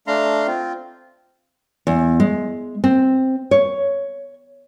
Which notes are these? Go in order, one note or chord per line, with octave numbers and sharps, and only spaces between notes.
A3 D4 F5 A#5 C6
C4 F4
E2
G#3
C4
C#5